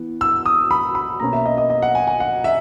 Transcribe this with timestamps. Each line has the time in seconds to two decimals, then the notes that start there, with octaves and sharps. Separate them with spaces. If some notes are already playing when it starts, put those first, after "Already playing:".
Already playing: E3 B3
0.21 E6
0.46 D#6
0.71 B5
0.95 B5
1.20 B2 A#3 C#4 A#5
1.33 E5
1.46 D#5
1.58 D#5
1.70 D#5
1.82 F#5
1.95 G#5
2.07 G#5
2.20 F#5
2.44 E5